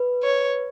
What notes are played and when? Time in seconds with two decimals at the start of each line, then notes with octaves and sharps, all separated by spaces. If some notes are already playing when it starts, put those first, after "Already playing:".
Already playing: B4
0.23 C#5